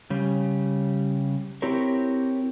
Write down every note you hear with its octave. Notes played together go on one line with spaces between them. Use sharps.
C#3 G3
C4 E4 F#4 G4 A#4 C#5